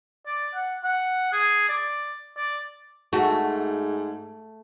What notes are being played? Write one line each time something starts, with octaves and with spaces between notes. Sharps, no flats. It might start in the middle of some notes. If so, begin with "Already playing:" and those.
D5
F#5
F#5
G#4
D5
D5
G#2 A3 F#4